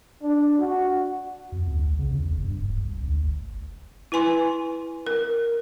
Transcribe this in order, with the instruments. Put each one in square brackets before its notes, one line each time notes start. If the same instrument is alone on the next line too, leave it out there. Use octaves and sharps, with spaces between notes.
[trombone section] D4
F#4
[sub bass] F2
D2
B1
C#3
E2
F#1
G2
D#1
C2
D2
G1
[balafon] E4 B4 G#5 C6
A#4